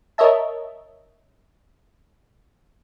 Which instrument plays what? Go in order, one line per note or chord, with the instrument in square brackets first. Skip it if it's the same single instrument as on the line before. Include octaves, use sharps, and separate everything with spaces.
[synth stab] A#4 C#5 D#5 E5 A5